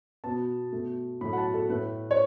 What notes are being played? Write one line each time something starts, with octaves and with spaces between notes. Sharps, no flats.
B2 B3 A5
B2 A3
A2 F#3 A3 B5
F#5
A5
A4
A2 A3 B4
C#5